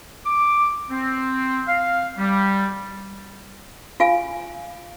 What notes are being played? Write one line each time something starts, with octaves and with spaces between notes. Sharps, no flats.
D6
C4
F5
G3
F4 F5 G#5